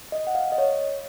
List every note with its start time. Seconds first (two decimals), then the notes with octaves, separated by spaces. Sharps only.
0.12 D#5
0.27 F#5
0.35 F5
0.52 D#5
0.58 C#5